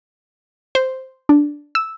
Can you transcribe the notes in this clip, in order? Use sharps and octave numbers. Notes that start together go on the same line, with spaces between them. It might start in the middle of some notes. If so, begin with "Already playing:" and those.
C5
D4
E6